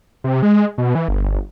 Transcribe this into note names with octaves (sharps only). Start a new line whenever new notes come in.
C3
G#3
B2
E3
G1